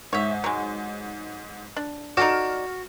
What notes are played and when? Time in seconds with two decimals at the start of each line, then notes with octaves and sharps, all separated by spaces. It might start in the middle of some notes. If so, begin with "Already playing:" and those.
0.13 G#2 C#5 E5
0.44 F#3 G#3
1.76 D4
2.17 D#4 F#4 A4 D5 F6 E7